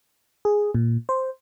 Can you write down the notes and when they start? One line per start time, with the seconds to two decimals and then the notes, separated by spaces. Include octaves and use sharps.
0.45 G#4
0.75 A#2
1.09 C5